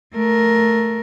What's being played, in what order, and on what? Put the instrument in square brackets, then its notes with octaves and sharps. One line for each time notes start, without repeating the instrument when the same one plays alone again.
[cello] A3 A#4